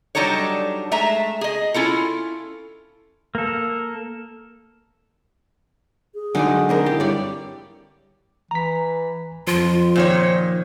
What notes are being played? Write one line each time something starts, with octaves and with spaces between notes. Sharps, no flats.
F#3 G3 D4 D#4 A4 C#5
G#3 A3 E5 A#5
G#4 D#5
C#4 E4 F4 A4
A#3 A4
G#4
D3 F#3 G#3 D#4 D5
C4 D4 A#4
E4 G4
G2 G3 C#5 D5
E3 A#5 B6
F2 F3 F4
A#2 D#3 C5 C#5